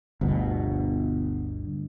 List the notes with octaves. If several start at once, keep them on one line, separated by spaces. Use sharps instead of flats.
G1 D2 B2